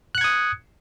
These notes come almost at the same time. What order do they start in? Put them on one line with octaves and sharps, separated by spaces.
F#6 C#7 G#6 D#6